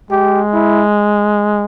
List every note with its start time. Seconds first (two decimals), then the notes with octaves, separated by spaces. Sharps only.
0.11 G#3 G4
0.53 E4